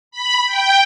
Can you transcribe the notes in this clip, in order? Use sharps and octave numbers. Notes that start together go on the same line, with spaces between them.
B5
G5